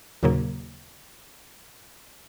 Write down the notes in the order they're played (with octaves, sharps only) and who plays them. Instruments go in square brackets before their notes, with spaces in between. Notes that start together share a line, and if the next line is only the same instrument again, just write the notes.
[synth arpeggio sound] D#2 A#2 C#3 F#3 A#3